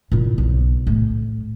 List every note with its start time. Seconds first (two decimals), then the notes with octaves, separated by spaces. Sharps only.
0.12 A#2 E4
0.38 B1
0.87 A2